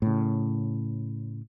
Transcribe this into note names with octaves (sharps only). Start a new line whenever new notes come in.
A2 C#3